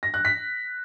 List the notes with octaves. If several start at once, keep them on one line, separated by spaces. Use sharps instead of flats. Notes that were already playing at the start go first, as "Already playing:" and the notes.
A#6
F#6
B6